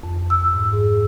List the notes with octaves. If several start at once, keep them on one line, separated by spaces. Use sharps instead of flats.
F2
E6
G#2
G#4